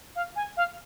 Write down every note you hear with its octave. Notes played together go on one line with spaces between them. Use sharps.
F5
G#5
F5